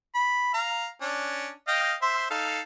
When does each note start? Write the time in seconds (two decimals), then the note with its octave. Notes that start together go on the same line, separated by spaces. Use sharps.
0.15 B5
0.54 F5 A#5
1.02 C#4 D4
1.68 D#5 F5 G5
2.02 C5 E5 C6
2.31 D#4 A4 F5